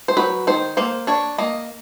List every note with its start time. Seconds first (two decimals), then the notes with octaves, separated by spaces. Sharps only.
0.08 C5
0.17 F#3 B4
0.47 D#3 C5
0.77 A#3 C5
1.07 D4 C#5
1.38 A#3 D#5